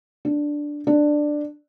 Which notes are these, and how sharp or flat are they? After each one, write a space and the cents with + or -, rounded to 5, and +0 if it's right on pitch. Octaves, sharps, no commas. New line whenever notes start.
D4 +0
D4 +10